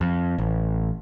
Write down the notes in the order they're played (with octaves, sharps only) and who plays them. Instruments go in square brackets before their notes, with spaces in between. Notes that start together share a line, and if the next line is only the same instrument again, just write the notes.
[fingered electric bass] F2
A1